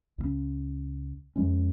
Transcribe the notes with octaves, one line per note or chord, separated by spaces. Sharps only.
C#2 C#3 G#3 C#4
F2 F3 G#3 C#4